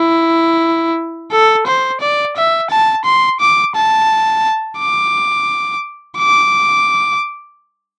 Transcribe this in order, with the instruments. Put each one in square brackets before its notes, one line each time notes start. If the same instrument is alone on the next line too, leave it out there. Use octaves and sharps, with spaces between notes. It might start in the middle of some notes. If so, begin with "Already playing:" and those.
Already playing: [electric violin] E4
A4
C5
D5
E5
A5
C6
D6
A5
D6
D6